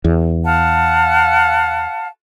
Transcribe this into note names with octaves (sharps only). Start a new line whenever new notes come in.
E2
F5 F#5 A5